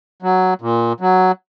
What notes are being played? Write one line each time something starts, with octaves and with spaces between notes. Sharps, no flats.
F#3
A#2
F#3